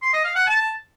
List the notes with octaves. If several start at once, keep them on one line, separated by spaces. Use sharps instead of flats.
C6
D#5
F5
F#5
A5